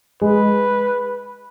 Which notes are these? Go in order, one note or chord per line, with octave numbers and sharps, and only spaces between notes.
G#3 B4